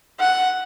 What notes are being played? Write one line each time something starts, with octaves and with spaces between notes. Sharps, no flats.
F#5